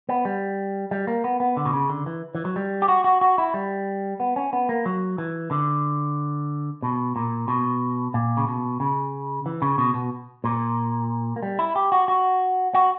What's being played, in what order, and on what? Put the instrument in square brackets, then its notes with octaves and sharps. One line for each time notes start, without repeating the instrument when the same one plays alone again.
[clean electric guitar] B3
G3
G3
A#3
B3
B3
D3
B2
C#3
D3
E3
E3
F#3
G3
G4
F#4
F#4
F#4
E4
G3
B3
C#4
B3
A#3
F#3
E3
D3
B2
A#2
B2
A#2
C#3
B2
C#3
E3
C#3
B2
B2
A#2
A#3
G3
E4
G4
F#4
F#4
F#4